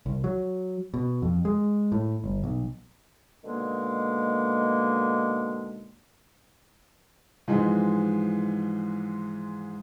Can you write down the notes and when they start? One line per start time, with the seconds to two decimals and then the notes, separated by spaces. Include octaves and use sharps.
0.06 C2
0.24 F#3
0.94 B2
1.22 F2
1.45 G#3
1.92 A2
2.24 G1
2.44 B1
3.44 B2 D3 D#3 G#3 A#3
7.48 G#2 E3 F3 G#3